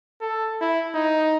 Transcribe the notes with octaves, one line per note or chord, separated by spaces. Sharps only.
A4
E4
D#4